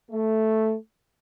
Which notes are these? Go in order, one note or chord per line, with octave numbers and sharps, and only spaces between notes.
A3